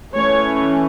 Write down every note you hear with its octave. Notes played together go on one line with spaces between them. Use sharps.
E3 A3 C#4 C#5